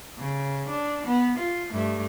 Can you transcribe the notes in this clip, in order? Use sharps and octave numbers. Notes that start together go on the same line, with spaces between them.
C#3
D4
B3
F4
G2 A3